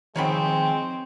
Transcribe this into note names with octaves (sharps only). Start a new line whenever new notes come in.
D#3 F3 G#3 C4 C#5 G5 B5